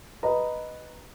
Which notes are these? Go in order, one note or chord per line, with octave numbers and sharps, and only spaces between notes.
B4 D#5 A#5